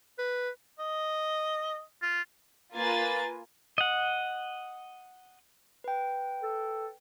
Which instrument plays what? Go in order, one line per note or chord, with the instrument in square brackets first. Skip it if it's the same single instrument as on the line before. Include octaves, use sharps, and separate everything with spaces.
[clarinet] B4
[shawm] D#5
F4
[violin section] A#3 F4 B4 G#5 A6
[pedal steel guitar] D#5 F#5
[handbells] B4 G5
[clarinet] A4